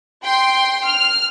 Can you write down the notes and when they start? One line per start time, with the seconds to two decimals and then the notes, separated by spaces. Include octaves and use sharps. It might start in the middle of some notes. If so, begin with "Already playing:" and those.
0.24 G5 C6
0.86 F6